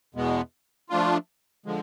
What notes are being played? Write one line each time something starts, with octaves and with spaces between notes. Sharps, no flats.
E2 B2 G#3 B3
F3 A3 D4 F4
D3 F3 G#3